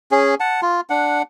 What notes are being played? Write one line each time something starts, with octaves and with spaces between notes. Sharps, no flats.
C#4 G#4
F#5 A5
F4
D4 F#5